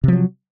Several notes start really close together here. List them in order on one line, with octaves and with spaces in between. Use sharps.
C3 F3 F#3